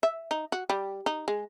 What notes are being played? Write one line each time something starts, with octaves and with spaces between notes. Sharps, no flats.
E5
D#4
F#4
G3
D#4
G#3